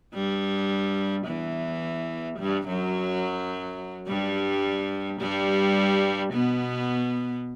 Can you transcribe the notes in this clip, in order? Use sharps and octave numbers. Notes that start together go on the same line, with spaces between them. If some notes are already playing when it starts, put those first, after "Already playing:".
G2 G3
E2 E3
G2 G3
F#2 F#3
G2 G3
G2 G3
B2 B3